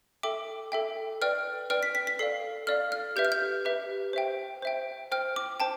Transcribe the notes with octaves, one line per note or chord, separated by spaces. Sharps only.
A4 E5 G5 D6
A4 E5 G5
B4 D5 G5 F6
B4 D5 G5 F6
B6
B6
B6
A4 D5 F5 C7
A4 D5 F5 F6
F6
G4 B4 E5 G6
F6
G6
G4 B4 E5
C5 E5 G5
C5 E5 G5
C5 G5 F6
D6
C5 G5 A5